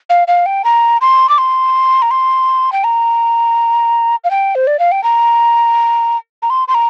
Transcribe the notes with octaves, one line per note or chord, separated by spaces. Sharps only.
F5
F5
G5
A#5
C6
D6
C6
A#5
C6
G5
A#5
F5
G5
C5
D5
F5
G5
A#5
A#5
C6
C6
A#5